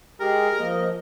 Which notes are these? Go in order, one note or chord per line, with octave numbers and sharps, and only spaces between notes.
G#3 G4 G#4 A#4
F3 A#3 D#5